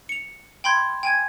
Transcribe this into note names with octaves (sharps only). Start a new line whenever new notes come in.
C#7 F7
G5 B5 C6 G6 G#6
G5 G#5 G#6